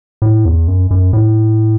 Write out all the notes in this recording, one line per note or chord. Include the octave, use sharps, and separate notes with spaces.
A2
E2
F#2
F#2
A2